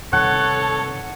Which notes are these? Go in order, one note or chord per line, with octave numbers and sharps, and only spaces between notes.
G2 C3 D#3 A4 C#5 F#5